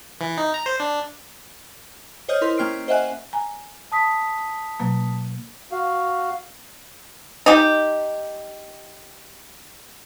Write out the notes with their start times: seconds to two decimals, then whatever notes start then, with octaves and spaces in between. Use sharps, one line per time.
0.21 E3
0.38 D#4
0.54 A#5
0.66 C5
0.80 D4
2.29 C5 C#5 D#5 D#6 F6 G6
2.41 E4 A#4 C6
2.58 A#3 C#4 G5 F6 C7 D7
2.88 C5 D#5 E5 F#5 G#5 F#6
3.33 G#5 A#5
3.92 A5 D#6 B6
4.80 B2 F#3 A#3
5.72 F#4 F5
7.46 D#4 G4